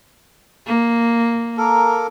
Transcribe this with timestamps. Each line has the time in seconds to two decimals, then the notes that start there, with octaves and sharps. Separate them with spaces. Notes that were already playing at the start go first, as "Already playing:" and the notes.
0.67 A#3
1.58 A#3 A4 A#4